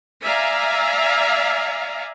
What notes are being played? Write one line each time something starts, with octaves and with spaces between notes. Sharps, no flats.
D5 E5 F5 G#5 A#5